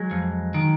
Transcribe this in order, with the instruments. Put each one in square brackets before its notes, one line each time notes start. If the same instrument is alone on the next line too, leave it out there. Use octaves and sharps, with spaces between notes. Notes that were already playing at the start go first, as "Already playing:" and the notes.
Already playing: [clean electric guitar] F#3 G#3
F2
D#3